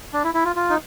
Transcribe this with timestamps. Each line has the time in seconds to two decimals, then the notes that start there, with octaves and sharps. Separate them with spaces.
0.13 D4
0.24 E4
0.34 E4
0.45 F4
0.56 F4
0.70 D#4